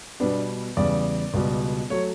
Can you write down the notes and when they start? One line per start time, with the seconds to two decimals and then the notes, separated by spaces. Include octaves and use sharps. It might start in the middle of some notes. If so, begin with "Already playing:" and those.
0.20 B2 G3 B3 D4
0.77 E2 C#3 G3 D5
1.34 C#2 B2 G3
1.90 F#3 A3 C#5